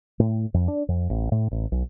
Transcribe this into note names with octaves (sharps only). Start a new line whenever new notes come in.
A2
F2
D4
F2
A1
A2
A1
B1